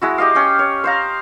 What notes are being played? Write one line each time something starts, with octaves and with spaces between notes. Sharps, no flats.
G#3 E4 F#4
G4 D#5 F5
C#4 G5
C#5
C5 F5 A#5